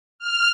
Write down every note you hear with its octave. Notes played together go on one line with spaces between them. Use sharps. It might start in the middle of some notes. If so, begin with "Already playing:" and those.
F6